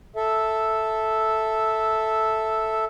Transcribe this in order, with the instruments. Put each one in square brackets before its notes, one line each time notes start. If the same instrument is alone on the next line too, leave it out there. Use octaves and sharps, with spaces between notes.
[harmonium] A4 E5